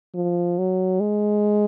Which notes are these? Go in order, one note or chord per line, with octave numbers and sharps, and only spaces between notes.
F3
F#3
G#3